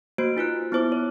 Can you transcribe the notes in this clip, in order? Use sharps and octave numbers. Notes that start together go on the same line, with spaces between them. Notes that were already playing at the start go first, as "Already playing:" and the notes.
A#3 F#4 C5 D7
D#4 F4 B4 F#6
B3 E4 C5 D6
C#5